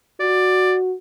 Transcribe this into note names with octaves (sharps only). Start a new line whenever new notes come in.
F#4 D5